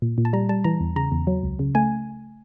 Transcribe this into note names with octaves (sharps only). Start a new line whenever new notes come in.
A#2
A#2
A5
G3 A#5
G3 A5
E3 A#5
E2
C#3 A#5
E2
F#3
C#2
C#3
A3 G#5